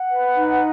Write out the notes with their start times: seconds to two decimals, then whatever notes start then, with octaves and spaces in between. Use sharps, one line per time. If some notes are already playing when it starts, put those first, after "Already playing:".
Already playing: F#5
0.12 B4
0.35 D#4